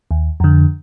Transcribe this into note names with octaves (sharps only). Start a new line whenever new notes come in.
D#2
F2 D3